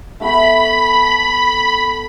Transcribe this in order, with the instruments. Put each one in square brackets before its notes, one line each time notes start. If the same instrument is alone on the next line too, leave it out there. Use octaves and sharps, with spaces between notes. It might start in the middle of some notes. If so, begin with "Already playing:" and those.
[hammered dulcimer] A3 B3 G5 [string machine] B5